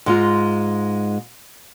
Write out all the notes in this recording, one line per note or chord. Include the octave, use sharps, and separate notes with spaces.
G#2 G#3 F4